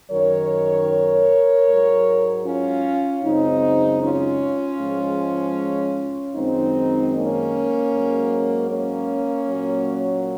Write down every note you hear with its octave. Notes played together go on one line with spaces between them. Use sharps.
F#2 D#3 F#3 A#4 C#5
G#2 F#3
C#4 F4
F#2 C#3 G#3 C4 D#4
C#4 F4
G#2 F3 G#3
F#2 D#3 G#3 C4 D#4
A#3 C#4
G#2
F#3
A#3 C#4
A#2 F#3